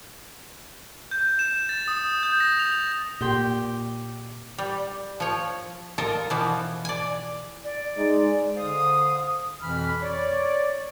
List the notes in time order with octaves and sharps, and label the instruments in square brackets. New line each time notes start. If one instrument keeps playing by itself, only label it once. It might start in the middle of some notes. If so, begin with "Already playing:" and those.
[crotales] G6
E7
A6
D#6
G6
A#6
F7
[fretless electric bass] A#2 [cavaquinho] G4 G5 C6
[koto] G3
F3 C#5
F4 A4 A#4 D#5
B2 E3 F3
D5 G#5
[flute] D5
[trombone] G#3 [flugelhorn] D#4
[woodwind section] D3 C5 F5 D#6
F2 B2 E3 B5 F6
C#5 D5